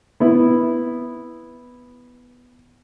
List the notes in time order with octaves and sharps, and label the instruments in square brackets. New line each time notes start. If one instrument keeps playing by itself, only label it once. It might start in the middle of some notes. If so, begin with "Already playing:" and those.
[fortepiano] B3 E4